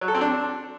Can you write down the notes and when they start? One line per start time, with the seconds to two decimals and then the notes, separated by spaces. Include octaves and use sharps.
0.01 F#3
0.08 A4
0.15 C4
0.21 D4